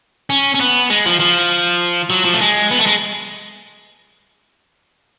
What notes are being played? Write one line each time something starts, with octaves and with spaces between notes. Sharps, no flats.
C#4
C#4
B3
G#3
F3
F3
F#3
F3
A3
G#3
B3
A3
G#3